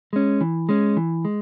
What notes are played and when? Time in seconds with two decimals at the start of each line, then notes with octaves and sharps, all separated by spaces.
0.13 G#3 C#4
0.41 E3
0.69 G#3 C#4
0.97 E3
1.25 G#3